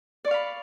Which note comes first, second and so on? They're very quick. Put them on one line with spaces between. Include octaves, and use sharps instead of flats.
D5 C#6 F5 B5